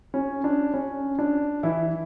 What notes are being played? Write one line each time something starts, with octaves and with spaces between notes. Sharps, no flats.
C#4
D4
C#4
D4
E3 E4